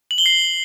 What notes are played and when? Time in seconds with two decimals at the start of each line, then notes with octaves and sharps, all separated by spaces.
0.11 F#7
0.18 G7
0.26 C7